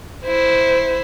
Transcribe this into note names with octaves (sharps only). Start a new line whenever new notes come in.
E4 C5